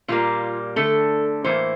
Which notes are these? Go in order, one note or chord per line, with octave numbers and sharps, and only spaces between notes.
A#2 G3 A#3 F4
D3 A3 A4
A2 E3 A#3 C5